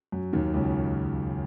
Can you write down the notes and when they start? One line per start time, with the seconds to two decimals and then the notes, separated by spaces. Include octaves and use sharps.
0.12 F#2 F#3
0.33 D#2 D#3
0.54 C#2 C#3